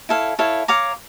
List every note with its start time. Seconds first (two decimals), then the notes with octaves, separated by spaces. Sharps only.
0.09 E4 A4 C#5 F5
0.39 E4 A4 C#5 F5
0.68 C#5 F5 A#5 D6